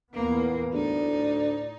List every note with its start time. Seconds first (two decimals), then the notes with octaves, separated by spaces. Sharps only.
0.14 E2 A#2 A#3 B3
0.73 D2 A2 D#4 D5